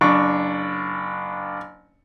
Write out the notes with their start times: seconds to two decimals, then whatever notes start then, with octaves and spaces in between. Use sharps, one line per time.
0.01 F#1 D4 C#6